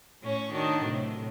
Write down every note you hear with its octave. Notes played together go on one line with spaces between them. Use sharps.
A2 C#4 C#5
D#3 D4 F#4
A2 C3 F#3